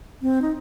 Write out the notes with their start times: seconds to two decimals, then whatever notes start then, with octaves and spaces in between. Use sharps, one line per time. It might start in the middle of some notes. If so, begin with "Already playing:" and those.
0.22 C4
0.42 D#4